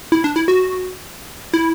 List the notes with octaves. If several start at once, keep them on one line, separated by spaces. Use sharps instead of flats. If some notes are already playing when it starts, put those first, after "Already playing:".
E4
D4
E4
F#4
E4